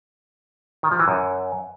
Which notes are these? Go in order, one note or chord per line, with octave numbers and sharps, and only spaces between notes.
D#3
F3
E3
F#2